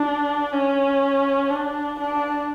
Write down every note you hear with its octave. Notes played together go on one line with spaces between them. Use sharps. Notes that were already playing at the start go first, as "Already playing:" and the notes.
Already playing: D4
C#4
D4
D4